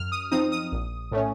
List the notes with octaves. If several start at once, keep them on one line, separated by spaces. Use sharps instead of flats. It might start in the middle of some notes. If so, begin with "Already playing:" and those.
Already playing: F#2 F6
D#6
F3 C4 D#4 D#6
D#6
A#1
A2 A3 C#4